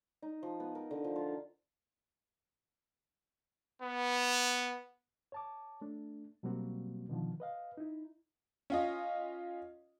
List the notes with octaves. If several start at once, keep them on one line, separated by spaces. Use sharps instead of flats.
D#4
F3
B3
A#4
D3
F3
F4
B3
C#5 A5 D6
A3 D4
B2 F#3 G3 A#3 C4 F#4
B2 D3 D#3 F3
B4 D#5 F5
D#4 E4
C#4 F4 D#5